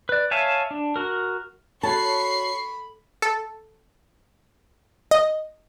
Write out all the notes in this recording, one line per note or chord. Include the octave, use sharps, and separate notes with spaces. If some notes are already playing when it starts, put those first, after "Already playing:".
B4 D5
C#5 E5 F5 G#5 A5
D4
F#4 A#4
F#4 A4 C#5 A5 B5 C#6 C7
A4
D#5